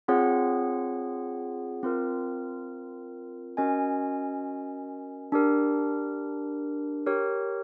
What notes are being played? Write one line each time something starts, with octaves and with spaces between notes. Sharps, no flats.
C4 F4 G#4 C#5 F#5
C4 F4 A#4
C#4 F#4 A#4 D#5 G#5
D4 G4 A#4
G4 A#4 C#5